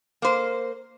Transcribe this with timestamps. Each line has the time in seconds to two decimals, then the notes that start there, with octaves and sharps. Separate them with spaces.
0.22 A#3 C5